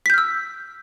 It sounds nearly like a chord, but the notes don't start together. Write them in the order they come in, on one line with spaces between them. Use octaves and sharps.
B6 G6 F6 E6